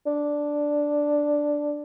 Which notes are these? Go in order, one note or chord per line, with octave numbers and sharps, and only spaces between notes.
D4